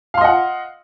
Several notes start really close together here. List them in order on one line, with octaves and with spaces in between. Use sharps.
F5 C6 D#5 F#5